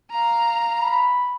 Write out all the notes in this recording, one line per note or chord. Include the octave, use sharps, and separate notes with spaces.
F5 A#5
B5